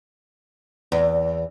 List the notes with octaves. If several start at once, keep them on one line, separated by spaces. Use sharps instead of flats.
E2